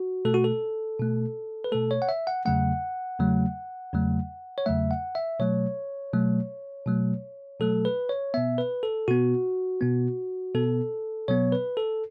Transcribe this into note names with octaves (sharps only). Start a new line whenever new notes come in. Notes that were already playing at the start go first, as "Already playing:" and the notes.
Already playing: F#4
B2 A3 A4
F#4
A4
B2 A3
B4
B2 A3 A4
C#5
F#5
E5
F#5
E2 C#3 F#3 A3 F#5
E2 C#3 F#3 A3
E2 C#3 F#3 A3
C#5
E2 C#3 F#3 A3 E5
F#5
E5
B2 F#3 A3 C#5
B2 F#3 A3
B2 F#3 A3
B2 F#3 A3 A4
B4
C#5
B2 B3 E5
B4
A4
B2 B3 F#4
B2 B3
B2 B3 A4
B2 F#3 B3 C#5
B4
A4